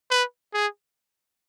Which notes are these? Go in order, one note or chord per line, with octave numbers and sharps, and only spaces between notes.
B4
G#4